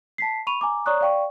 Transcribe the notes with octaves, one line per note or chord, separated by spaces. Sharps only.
A5 B6 C7
B5 C#6 D#7 F7
G#5 A#5 D6
C#5 D5 A#5 C#6 D#6 F#6
D5 F5 G5 C#6